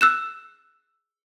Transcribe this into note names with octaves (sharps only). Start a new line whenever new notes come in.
E6 F#6 E7